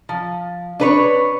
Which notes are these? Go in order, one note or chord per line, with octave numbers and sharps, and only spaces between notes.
F3
D4 B4 C#5